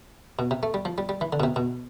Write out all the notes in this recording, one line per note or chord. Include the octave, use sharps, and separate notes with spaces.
B2
C3
A3
G3
F3
G3
G3
E3
D3
B2
C3
B2